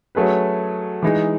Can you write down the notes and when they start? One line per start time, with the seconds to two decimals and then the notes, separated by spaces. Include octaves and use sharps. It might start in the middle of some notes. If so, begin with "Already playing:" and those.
0.15 F#3 A3 C#4 G#4 B4
1.02 E3 G#3 D#4